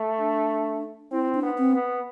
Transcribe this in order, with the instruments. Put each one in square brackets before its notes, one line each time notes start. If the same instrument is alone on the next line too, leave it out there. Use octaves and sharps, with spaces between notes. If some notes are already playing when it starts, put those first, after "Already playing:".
Already playing: [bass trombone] A3
[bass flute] D4
[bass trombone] C4 [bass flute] E4
[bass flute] D4
[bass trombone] B3
[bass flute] C4
[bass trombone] B3